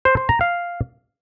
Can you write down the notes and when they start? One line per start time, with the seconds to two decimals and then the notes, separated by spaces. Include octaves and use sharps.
0.05 C5
0.17 C5
0.29 A#5
0.41 F5